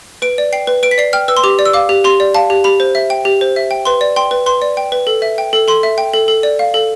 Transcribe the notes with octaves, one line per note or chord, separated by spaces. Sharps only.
B4 D7
D5
G5 C7
B4
B4 D7
B6
D5 C7
G5 F6
B4 E6
C6
G4 D6
D5
E6
F5 D6
G4
G4 C6
D5
F5 A5
G4
G4 B5
C5
E5
G5
G4
C5
E5
G5
B4 C6
D5
G5 C6
B4
B4 C6
D5
G5
B4
A4
E5
G5
A4
A4 C6
E5
G5
A4
A4
D5
F5
A4